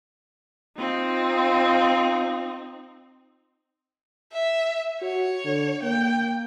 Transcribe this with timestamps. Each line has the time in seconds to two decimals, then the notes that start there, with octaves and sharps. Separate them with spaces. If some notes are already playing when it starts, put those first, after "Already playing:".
0.79 C4 D#4 F4
4.33 E5
5.02 F#4 C#5
5.45 D3
5.83 A#3 G5